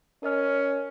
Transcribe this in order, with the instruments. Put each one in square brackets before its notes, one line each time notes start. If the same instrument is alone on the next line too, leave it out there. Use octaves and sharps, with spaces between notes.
[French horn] C#4 [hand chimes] A#4 D#5 F6